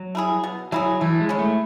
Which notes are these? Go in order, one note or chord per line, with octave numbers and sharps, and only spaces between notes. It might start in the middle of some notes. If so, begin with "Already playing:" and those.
Already playing: F#3
A3 E4 G#4
B2
F#3 A3 E4 G#4
E3 A3
G#3
C#4 E4
A3